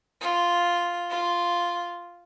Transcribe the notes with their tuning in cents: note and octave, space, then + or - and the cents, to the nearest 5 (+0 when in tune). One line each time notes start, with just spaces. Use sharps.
F4 +0
F4 -5